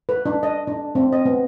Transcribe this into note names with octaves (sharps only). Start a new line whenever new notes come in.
B4
D4
D#5
D4
C4
D#5
B3